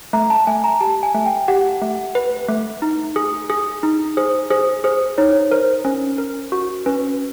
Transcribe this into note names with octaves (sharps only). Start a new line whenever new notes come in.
A3 A#5
A5
A3 G#5
A#5
G4 A5
G#5
A3
G5
G4 F#5
A3
B4
A3
D#4
G#4
G#4
D#4
G#4 C5
G#4 C5
G#4 C5
D#4 C#5
A#4 C5
C#4
A#4
F#4
C#4 B4